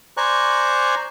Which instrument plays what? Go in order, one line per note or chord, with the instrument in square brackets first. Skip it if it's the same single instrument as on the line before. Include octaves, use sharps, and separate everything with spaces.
[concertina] C5 D5 G#5 A#5 C#6 F#6